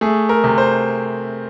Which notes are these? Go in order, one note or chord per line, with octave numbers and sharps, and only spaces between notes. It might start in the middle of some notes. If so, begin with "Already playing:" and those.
A3 G#4
A#4
C3
C5